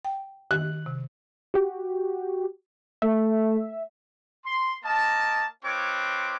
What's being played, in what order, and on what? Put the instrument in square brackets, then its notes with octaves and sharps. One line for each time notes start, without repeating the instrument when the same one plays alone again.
[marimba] G5
[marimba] D#3 [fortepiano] F#6
[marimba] C3
[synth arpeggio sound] F#4 G4
[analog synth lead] A3 [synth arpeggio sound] E5
[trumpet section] C6
A#3 A#4 D#5 A5
C4 F4 B4 C#5 D#5 D6